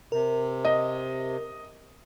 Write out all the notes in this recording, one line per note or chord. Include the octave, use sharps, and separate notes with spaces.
C3 A#4
D#5